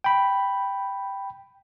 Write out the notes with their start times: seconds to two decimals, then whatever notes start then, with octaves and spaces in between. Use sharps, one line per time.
0.04 G5 B5